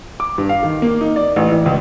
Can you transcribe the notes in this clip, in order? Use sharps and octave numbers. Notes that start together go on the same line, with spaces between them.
D6
G2
F5
D#3
A#3
D#4
D5
A1
E3
C#2